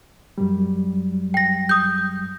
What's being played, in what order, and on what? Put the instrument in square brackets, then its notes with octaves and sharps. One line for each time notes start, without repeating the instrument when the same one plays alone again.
[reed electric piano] F#2 F#3 G3
[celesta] G5 A#6
D#6 G6